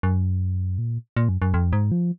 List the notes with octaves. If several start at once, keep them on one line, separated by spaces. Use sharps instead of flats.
F#2
A#2
A#2
F#2
F#2
F2
G#2
F3